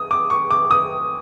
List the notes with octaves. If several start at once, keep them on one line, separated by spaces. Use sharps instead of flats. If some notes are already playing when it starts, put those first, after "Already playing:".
Already playing: D#6
D6
C#6
D6
D#6